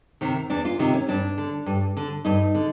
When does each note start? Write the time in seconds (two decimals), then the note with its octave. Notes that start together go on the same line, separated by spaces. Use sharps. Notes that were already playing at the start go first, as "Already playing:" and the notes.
0.21 C3 D#3
0.50 E2 D4
0.65 F4
0.79 C3 D#3 D#4
0.94 C#4
1.08 G2 D4
1.38 D3
1.66 G2
1.97 D3
2.25 G2 D#4
2.55 D3